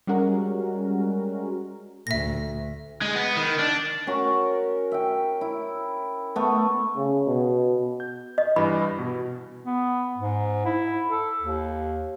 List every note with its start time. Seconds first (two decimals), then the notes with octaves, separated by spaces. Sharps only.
0.07 G3 G#3 C#4 F#4 A#4
2.07 D2 E5 A#6
3.02 G#3
3.15 B3
3.37 D#3
3.59 D4
4.07 C#4 F#4 A#4
4.92 E5 G5
5.41 E4
6.36 A3 B3
6.97 C#3
7.27 B2
8.00 G6
8.38 D#5
8.56 G2 E3 B5
8.99 B2
9.65 B3
10.18 G#2
10.65 E4
11.10 A4
11.42 D#2